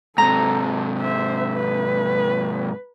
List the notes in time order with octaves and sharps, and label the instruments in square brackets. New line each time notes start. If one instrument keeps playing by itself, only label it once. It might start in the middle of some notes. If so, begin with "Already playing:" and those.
[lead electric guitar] G#2 C3 [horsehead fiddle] A4 [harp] A#5
[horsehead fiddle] C5 E5
B4